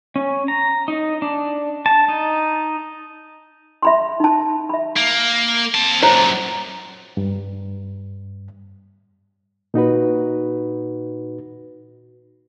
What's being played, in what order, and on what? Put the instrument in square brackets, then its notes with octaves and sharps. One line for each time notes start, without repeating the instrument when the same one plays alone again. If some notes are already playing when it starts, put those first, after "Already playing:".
[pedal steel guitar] C#4
A#5
D#4
D4
A5
D#4
[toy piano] E5 B5 C6
D#4 A5
E5 B5
[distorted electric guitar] A#3
C4 A5
[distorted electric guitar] F#2 A#2 [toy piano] C5 C#5 A#5
[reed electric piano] G2
A#2 D#4 F#4 B4